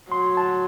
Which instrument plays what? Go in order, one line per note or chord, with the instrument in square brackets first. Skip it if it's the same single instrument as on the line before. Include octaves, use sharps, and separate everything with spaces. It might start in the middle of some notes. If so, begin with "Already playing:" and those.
[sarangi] F#3 [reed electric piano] C6
[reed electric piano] A5